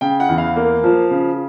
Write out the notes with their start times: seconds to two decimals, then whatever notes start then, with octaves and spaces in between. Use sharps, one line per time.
0.01 C#3 G5
0.20 F#5
0.29 E2
0.38 F5
0.56 A#3
0.84 F3
1.11 C#3